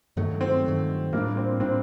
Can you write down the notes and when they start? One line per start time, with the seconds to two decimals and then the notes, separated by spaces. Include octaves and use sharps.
0.17 G2 D#3 F#3 A3
0.41 C4
0.65 G2 D#3 F#3 A3
1.12 A2 G3 A#3 D4
1.37 C4
1.60 A2 G3 C4 D4